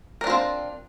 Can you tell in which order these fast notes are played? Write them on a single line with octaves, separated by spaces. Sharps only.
A#4 D4 F4 C4